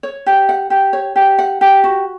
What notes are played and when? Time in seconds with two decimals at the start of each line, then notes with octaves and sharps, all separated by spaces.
0.03 C#5
0.26 G4
0.49 F#5
0.70 G4
0.93 C#5
1.16 G4
1.38 F#5
1.61 G4
1.84 F#4